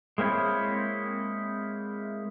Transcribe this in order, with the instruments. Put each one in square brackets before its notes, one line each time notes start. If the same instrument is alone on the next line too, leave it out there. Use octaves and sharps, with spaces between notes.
[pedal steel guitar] G#3 A#3 C4 E4 C#5